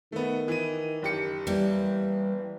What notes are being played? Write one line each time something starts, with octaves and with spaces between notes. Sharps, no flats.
D#3 A3 B3
E3 D#7
F#1 G4 C#7
E3 G3 A#3